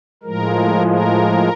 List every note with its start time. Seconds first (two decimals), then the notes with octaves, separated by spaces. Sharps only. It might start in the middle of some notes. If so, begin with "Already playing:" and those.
0.23 A2 F3 G#3 A#4
0.87 A#4